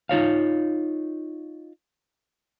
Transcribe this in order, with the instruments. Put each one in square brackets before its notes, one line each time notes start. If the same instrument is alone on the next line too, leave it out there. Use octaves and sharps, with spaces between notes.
[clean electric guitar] D#4 F4 C#5 F5